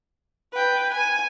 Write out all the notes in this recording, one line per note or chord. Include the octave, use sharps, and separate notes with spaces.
B4 G5
G#5